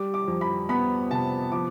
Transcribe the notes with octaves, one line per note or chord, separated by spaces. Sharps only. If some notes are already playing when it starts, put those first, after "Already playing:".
Already playing: G3 D6
D6
F2
B5
B3 B5
C3 A5
F3 D6